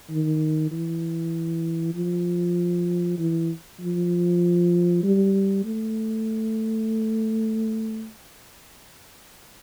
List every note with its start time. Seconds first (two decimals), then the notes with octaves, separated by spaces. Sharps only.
0.10 D#3
0.72 E3
1.95 F3
3.18 E3
3.80 F3
5.04 G3
5.64 A3